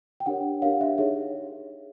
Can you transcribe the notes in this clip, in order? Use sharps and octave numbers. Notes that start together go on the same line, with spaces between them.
G5
D4 G4 A#4 C#5 F#5
D4 G4 A#4 C#5 F5
E5
D#4 G#4 C#5 E5